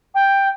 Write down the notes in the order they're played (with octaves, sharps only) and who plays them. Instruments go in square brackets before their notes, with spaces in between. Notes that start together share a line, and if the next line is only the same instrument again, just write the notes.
[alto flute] G5